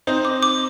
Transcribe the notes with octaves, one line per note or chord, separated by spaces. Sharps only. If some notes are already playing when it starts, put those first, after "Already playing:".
C4 D#4 C5
D6
D6